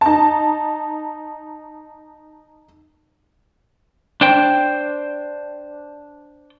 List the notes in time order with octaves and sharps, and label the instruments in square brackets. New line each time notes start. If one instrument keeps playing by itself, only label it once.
[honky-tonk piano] D#4 A5
[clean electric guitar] D4 C5 G5